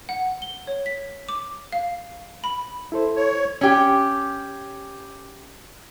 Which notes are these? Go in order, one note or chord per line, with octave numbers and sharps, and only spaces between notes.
F#5
G7
C#5
B6
D6
F5
B5
E4 A4 C5
C#5
C#4 G4